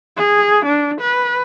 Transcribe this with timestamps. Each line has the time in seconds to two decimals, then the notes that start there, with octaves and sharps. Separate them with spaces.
0.16 G#4
0.65 D4
1.00 B4